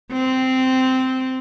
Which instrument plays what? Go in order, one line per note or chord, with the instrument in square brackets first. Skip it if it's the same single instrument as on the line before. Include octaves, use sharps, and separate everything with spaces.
[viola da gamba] C4